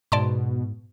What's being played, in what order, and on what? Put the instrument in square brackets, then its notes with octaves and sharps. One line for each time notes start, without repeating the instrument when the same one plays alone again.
[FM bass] G#2 [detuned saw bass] B2 [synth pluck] D5 A5 C6